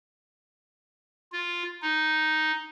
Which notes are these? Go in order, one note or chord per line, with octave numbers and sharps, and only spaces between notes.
F4
D#4